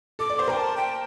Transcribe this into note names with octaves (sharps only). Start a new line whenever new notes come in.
A4 D6
D5
C5 C6
A#4 G5
A5
G5